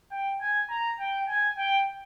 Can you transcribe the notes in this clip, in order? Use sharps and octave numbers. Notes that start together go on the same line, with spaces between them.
G5
G#5
A#5
G5
G#5
G5